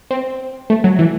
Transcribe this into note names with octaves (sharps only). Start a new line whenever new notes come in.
C4
A3
F#3
E3